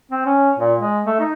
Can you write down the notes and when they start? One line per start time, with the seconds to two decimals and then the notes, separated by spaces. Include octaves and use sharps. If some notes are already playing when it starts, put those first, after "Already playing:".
0.12 C4
0.26 C#4
0.58 A#2
0.80 G#3
1.06 A3
1.20 D#4